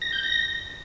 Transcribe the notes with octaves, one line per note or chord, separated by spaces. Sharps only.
A#6
G6
A#6